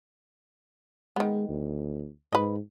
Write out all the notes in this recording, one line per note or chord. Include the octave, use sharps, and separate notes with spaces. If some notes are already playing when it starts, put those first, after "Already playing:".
D#3 G#3 B3
D2
G#2 B4 D#5